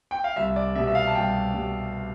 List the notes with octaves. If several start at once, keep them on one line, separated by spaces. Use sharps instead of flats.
G5
F5
C2 E5
D5
B2 G3 E5
E5
F5
A5
C2 G5
B2 G3